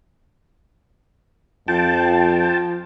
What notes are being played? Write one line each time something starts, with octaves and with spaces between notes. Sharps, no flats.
F2 F3 G5 A5